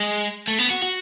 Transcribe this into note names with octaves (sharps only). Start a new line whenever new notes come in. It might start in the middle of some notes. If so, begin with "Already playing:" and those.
Already playing: G#3
A3
B3
F#4
F#4